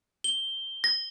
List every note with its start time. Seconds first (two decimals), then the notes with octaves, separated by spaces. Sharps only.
0.24 G7
0.84 A#6